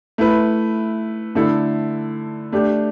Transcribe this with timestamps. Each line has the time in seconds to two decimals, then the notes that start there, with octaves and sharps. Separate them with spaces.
0.18 A3 E4 B4
1.35 D3 A3 E4 A4
2.52 A3 D4 G4